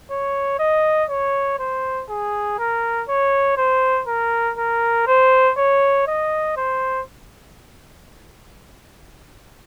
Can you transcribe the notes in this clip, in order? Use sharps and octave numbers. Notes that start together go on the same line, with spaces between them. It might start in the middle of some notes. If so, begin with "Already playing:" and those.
C#5
D#5
C#5
C5
G#4
A#4
C#5
C5
A#4
A#4
C5
C#5
D#5
C5